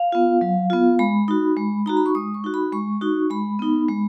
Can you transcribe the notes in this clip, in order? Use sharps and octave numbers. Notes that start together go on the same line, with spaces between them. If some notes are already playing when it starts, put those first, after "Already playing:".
Already playing: F5
B3 F4
F#3
B3 F4
G#3 B5
D#4 F#4
G#3
D#4 F#4 A#5
B5
C#6
G#3 D#6
C#6
D#4 F#4
B5
G#3 C#6
D#4 F#4
G#3 B5
B3 D#4
G#3